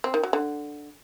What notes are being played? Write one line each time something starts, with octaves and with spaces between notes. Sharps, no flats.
C4
D#3
F#3
D3